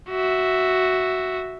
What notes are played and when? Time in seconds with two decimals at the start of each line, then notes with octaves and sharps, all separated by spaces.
0.10 F#4 E5